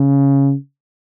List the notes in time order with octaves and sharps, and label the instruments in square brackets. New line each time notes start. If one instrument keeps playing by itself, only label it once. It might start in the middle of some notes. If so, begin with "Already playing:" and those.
Already playing: [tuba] C#3